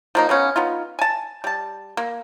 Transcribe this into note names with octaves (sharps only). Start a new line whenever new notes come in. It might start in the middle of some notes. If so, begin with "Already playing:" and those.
F3 A#3 D#4
C#3 B3 C#4
B3 D#4 F4
G#5 A5
G3 A5
A#3